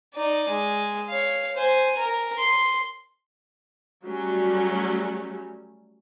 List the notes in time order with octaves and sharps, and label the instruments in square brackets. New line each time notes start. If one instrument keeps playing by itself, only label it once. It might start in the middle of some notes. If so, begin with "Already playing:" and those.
[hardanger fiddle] D#4 D5
G#3
C#5 F5
C5 G#5
A#4
C6
[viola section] F#3 G3 A3 C#4